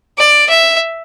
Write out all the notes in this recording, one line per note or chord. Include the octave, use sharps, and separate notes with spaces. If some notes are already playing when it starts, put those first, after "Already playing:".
D5
E5